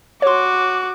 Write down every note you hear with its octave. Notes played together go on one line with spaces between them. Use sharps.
F#4 C#5 C6 D6